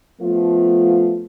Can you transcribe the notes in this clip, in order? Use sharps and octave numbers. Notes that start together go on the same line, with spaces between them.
F3 A3 B3 F4